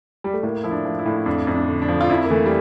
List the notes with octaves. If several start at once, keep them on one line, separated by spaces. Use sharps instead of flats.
G3
A3
A2 A#3
F3 E4
D4
F3
E4
A2
F2 D4
F2
D4
D3
D4
F3
F4
F2 E4
A#3
E3 A3
G3